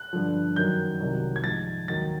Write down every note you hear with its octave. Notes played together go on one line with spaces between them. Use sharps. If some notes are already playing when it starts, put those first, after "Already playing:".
Already playing: F#6
G2 D3 F3
F#2 D#3 F#3 G6
C2 C3 D#3 F#3
G#6
G#2 F3 A6
D#2 D#3 F#3 A6